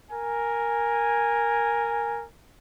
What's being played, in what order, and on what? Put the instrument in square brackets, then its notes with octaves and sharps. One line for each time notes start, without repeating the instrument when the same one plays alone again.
[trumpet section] A#4 G#5